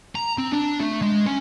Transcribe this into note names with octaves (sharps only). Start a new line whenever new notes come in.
A#5
C4
D4
A3
G#3
C#4